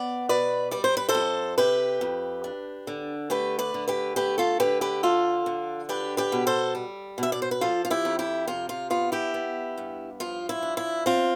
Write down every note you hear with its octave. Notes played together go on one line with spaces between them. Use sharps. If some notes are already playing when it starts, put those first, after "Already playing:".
Already playing: B3 D5
B2 B4 D5
G3 D5
C5
B4
A4 C5
F2
C3 G4 B4
F2
D4
D3
A3 G4 B4
B4 D5
D3
G4 B4
A3 G4 B4
F4 A4
D3 G4 B4
G4 B4
F3 F4 A4
D3
D4 G4 B4
G4 B4
B2
A4 C5
G3
B2 E5
D5
C5
B4
F3 F4 A4
F4
E4 G4
F2
E4 G4
C3 F4
F4
B3 F4
E4 G4
B3
G2
F3 F4
E4
D4
E4
C4 F4